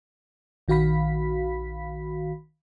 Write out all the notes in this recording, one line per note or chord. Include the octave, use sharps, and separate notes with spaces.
A#1 D#3 F#4 F5 B5 B6